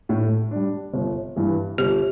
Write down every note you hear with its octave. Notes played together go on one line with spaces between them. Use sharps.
A2
G3 D4
G1
G2 E3
G1 G4